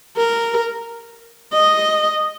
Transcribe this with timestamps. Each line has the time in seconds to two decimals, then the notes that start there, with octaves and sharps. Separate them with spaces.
0.17 A#4
1.53 D#5